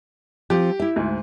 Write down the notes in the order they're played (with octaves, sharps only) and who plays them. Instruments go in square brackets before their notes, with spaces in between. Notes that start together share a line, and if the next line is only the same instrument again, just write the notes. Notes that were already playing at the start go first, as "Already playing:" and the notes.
[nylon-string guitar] F3 C4 [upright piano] G4
[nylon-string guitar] E4 E5
[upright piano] D2 G#2